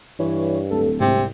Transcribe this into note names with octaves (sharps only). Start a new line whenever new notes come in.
G2 E3 C#5
D1 A4
C2 G#2 C3